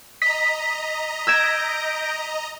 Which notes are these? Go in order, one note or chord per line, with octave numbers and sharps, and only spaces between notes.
D#5 A#5 B6
E6 G6 G#6 A#6 D7 E7